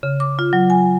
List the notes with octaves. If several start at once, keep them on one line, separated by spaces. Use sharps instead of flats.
C#3
D6
F4
F#3
G#5